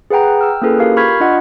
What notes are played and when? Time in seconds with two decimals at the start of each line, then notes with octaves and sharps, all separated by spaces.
0.10 G#4 B4 F#5 G5 A#5
0.41 G5 E6 F6
0.62 A#3 C#4 E4 G#4 A4 B4
0.79 F4 G4 A#4 F5
0.97 B5 C#6 F6 G6 G#6 B6
1.20 D4 F4 D#5 F#5